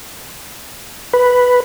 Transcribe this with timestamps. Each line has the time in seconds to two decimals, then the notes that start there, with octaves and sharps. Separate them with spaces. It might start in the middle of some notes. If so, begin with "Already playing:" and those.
1.14 B4